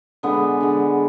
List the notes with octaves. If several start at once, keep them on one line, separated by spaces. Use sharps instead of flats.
D3 G#3 B3
D3 G#3